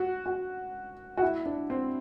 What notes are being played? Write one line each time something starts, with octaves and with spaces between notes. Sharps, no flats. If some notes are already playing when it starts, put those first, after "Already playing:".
Already playing: F#4
F#4
F#4
E4
D4
C4